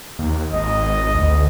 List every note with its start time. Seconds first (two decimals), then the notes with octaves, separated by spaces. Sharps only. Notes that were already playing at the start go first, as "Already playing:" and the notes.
0.19 D#2
0.53 G#1 D#5
1.15 D2